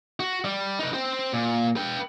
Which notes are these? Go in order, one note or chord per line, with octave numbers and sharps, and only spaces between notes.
F#4
G3
D#4 B4
C4 C5
A#2
B4 G5